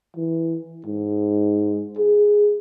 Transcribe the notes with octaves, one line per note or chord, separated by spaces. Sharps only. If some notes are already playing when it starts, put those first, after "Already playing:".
E3
G#2
G#4